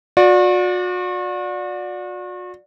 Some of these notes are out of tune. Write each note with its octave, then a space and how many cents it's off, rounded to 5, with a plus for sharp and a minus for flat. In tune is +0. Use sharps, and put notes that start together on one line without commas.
F#4 -40 D5 +0